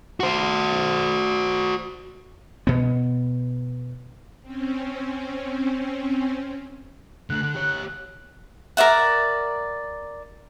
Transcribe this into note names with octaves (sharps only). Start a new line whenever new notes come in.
F#4 C5
B2 B3
C4 C#4
D3 A3 F#6
D3
G4 C#5
A#4 D5 E5 F#5